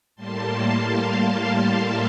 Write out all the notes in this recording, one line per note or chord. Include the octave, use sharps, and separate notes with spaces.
A2 G3 A#3 A5 C6
F5 A5
E5